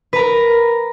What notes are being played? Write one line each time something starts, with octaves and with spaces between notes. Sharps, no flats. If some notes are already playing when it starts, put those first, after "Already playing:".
A#4 B4 A#5